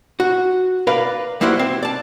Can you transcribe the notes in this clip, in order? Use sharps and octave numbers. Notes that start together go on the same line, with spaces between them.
F#4
A#4 B4 D5 F5
G3 A#3 E4 F#4 C5
C4
D5 A5